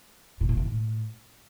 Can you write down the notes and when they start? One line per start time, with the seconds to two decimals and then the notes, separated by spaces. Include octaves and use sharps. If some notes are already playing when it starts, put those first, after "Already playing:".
0.41 A#2
0.49 A2
0.57 C3
0.65 A2